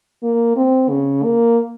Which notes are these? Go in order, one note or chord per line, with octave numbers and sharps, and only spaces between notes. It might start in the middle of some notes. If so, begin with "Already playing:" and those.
A#3
C4
C#3
A#3